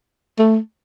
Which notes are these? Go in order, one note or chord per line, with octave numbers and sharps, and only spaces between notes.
A3